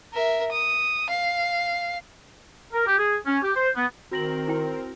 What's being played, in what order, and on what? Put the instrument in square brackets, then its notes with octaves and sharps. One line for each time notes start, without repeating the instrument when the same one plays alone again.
[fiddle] A#4 E5
D#6
F5
[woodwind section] A#4
G4
G#4
C#4
G4
C5
B3
[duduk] D#3 [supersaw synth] C4 A#4 [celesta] F#4 A#6 F#7
[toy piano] E4 G5